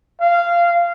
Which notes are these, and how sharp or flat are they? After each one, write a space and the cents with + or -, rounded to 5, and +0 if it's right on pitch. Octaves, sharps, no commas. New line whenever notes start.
F5 -15